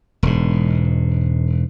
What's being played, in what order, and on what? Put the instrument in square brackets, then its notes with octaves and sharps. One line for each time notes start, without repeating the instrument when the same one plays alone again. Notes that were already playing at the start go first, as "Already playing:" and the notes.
[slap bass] E1 G#2